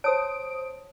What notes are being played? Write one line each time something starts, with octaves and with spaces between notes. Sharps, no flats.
C5 C#5 A5 D#6 D7